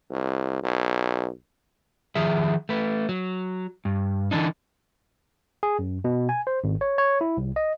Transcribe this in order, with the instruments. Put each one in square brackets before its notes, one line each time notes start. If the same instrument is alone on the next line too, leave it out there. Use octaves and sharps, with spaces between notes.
[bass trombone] C2
B1
[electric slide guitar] D#3 F3 G#4 E5
A3 B4
F#3
G2
D3 E3 G#3 D4 D#4
[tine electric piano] G#4
F#2
B2
G#5
C5
G#1
C#5
C#5
E4
C2
D#5